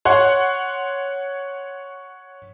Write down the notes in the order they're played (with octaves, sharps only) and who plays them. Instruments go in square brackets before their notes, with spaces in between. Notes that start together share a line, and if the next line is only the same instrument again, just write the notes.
[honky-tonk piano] C#5 F#5 C6